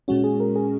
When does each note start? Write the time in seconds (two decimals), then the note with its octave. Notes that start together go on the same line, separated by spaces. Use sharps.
0.08 A#2 G#3 C#4 F#4
0.24 G#4
0.40 A#4
0.56 G#4